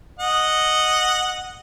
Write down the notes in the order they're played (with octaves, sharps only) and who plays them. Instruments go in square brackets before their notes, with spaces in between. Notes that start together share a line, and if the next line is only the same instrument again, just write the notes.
[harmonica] D#5 F#5